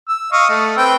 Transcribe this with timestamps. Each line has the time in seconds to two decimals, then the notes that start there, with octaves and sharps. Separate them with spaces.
0.08 E6
0.32 D#5 F5 C#6
0.50 A3
0.77 C4 B4 G5